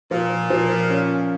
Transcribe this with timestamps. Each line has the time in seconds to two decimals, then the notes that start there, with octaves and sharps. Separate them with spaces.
0.11 A#2 F3
0.50 F3
0.90 C#4